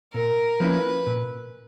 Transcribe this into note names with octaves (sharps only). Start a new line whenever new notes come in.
A#2 A#4
F3 A#3 C#4 E4 B4
A#2